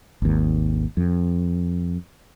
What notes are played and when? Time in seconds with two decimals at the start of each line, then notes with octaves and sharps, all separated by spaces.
0.22 G#1 D#2
0.97 F2